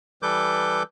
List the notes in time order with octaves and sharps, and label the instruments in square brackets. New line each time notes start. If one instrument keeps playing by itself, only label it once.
[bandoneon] E3 G3 A4 B4 D6 G6